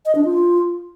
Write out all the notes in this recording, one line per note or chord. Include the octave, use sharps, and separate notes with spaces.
D#5
D4
F4